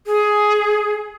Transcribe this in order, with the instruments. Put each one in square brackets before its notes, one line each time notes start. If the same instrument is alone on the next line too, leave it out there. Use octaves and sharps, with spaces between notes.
[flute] G#4